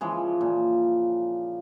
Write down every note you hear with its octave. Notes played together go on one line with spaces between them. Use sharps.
C#3 E3 F3 G#3
A#2